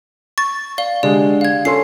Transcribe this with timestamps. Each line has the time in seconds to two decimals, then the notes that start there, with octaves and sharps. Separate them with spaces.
0.38 C#6 A6
0.78 D5 F5 G7
1.03 D3 G#3 G4 D5
1.41 F5 G#6
1.65 C#4 A4 C6 C7